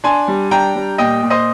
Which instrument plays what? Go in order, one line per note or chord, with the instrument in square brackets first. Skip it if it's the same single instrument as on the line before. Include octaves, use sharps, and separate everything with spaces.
[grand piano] D4 G#5 C6
G3
D4 G5 A#5
G3
A#2 D#5 G5
A#2
C5 D#5